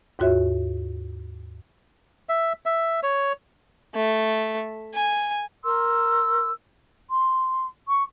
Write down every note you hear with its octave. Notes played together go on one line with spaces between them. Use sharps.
D#2 G#2 F4 F#4 C#5 E5
E5
E5
C#5
A3
G#5
A#4 C6 E6
C6
C#6